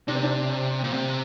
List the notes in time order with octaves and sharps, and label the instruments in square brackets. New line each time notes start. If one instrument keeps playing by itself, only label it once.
[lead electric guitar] C3 [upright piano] D4
[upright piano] C4
D4
[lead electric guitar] A#2
C3